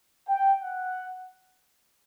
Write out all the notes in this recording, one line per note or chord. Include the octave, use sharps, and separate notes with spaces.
G5
F#5